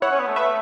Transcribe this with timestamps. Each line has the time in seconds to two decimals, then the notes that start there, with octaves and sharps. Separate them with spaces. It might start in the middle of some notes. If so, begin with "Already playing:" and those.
0.02 E4 C#5 F#5
0.11 C#4
0.19 B3
0.27 A3
0.36 B4 E5